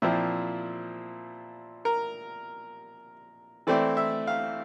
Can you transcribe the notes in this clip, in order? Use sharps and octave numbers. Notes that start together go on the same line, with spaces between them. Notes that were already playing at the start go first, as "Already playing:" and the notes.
A#2 F3 C4 E4 E5
A#4
E3 A3 C4 E4 D5
E5
F5